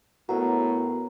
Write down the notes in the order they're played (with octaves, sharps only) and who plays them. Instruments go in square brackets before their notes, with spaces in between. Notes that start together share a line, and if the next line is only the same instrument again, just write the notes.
[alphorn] A2 [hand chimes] B3 B4 F#5 [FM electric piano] F#4 [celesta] A#4 A#5